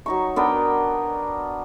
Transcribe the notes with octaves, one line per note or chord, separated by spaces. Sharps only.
F#3 D#4 C#6
B3 D4 A#4 G5